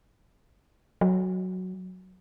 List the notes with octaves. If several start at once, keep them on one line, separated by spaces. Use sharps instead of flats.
F#3